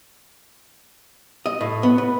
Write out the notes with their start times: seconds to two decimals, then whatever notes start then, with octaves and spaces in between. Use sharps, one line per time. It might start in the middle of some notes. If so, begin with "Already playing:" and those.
1.46 D#5
1.61 A2
1.83 B3
1.98 B4